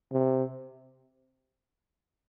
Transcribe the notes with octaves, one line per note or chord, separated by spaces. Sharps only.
C3